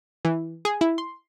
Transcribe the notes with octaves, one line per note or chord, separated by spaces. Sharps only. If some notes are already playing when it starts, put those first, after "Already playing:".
E3
G#4
E4
C6